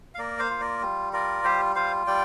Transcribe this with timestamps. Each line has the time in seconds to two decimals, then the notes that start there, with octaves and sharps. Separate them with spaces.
0.15 F5
0.19 A#3 A#4 D5
0.39 C5 F5
0.50 F4
0.60 A#4 D5
0.82 G3
1.13 F4 A#4 D5
1.44 G3 G4 C5
1.76 F4 C5 F5
2.07 G3 D5 G5